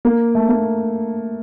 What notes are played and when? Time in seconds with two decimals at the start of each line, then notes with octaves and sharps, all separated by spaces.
0.05 A#3
0.35 A3
0.49 A#3